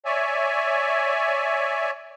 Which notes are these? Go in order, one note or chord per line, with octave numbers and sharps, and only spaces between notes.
C#5 D5 E5 G#5